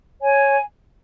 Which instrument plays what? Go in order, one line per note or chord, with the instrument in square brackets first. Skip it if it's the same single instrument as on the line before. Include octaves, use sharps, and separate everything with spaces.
[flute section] C#5 G#5